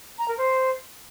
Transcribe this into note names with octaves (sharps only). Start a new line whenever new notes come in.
A#5
A#4
C5